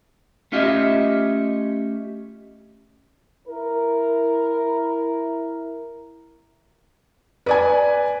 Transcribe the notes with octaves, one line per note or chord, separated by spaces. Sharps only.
A3 C#4 F4 G4 D#5 E5
E4 A#4
B4 D5 G#5